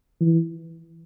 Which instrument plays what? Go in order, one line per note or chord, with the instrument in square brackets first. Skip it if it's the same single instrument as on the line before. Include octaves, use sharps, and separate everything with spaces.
[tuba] E3